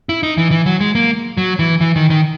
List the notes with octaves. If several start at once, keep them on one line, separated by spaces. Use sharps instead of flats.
E4
D#4
E3
E3
F#3
G#3
A#3
F#3
E3
E3
D#3
D#3